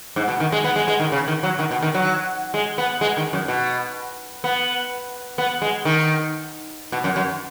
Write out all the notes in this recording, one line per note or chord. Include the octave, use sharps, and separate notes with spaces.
G#2
B2
D#3
G#3
B3
G#3
G#3
D#3
C#3
D#3
F#3
D#3
B2
D#3
F#3
G#3
B3
G#3
D#3
F#2
B2
B3
B3
G#3
D#3
B2
F#2
F#2